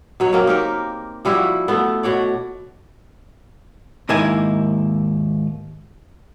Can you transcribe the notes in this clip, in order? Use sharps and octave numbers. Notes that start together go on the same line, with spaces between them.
B2 F#3 C#5
F#3 A#3 C4
D#4 G4 A#4
F3 G3 E4 F#4
A3 B3
B2 F#4 C#5 D5
D#2 G#2 A#3 E4 G#5